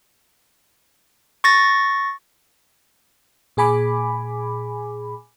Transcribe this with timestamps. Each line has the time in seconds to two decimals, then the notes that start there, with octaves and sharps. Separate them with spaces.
1.44 C#6 A6 A#6
3.57 A#2 G#4 G#5 B5 D6